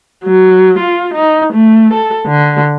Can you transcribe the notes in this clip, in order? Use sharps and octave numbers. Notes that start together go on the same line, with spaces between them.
F#3
F4
D#4
A3
A4
D3